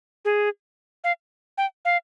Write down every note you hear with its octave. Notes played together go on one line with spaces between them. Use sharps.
G#4
F5
G5
F5